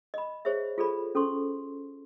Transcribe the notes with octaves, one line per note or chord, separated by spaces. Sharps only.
D#5 B5
G#4 C5 C#5 E5
F4 G#4 A4 C5 D5 B5
C#4 A4 C5 C6 C#6